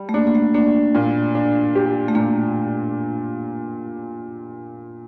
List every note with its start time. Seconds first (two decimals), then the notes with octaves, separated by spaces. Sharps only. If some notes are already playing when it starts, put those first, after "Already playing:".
Already playing: G3
0.09 A3
0.14 A#3 D4
0.27 A#3
0.35 A3
0.54 A#3 D4
0.95 A#2
1.35 D4
1.75 G4
2.08 A3
2.15 A#2 A#3